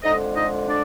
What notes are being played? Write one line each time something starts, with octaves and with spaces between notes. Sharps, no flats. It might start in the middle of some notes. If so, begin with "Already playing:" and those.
F2 D3 G#3 D#4 D#5
D#4 D#5
D4 D5